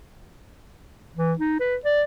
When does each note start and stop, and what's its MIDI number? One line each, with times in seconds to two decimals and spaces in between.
1.16 1.33 52
1.39 1.58 63
1.60 1.76 71
1.85 2.03 74